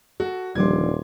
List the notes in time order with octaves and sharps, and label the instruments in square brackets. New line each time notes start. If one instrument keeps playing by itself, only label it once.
[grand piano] F#4 [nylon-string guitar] A4
[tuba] D#1 [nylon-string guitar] D3 F3 G3 [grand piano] C6 D6 G#6